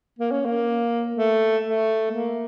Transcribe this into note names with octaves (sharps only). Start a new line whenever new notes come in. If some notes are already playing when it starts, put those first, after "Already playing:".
A#3
C#4
A#3
A3
A3
A#3